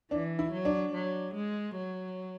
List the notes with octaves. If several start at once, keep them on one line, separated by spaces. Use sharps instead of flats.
E3 D4
E4
F#3
D4
F#3
G#3
F#3